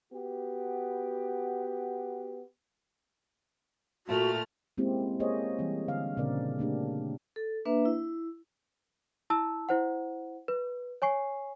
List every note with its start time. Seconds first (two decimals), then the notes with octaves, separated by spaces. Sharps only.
0.12 B3 F#4 G4
4.07 A#2 A3 F#4 F6
4.78 G#3 A#3 C4 C#4 E4 G4
5.20 A#3 G4 G#4 C5 C#5 D#5
5.59 E3 G3 C4
5.88 D3 F5
6.17 A#2 C#3 C4 D4 A#4 D5
6.59 A3 A#3 D4 G4
7.36 A4
7.65 A#3 D4 B4 E5
7.85 E4
9.30 E4 A5 E6
9.69 E4 C5 F#5
10.48 B4
11.02 C#5 G#5 C#6 C7